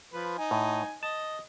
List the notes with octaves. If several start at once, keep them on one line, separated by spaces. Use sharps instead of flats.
F3 B4
D#4 G#5
A2
D#5 A5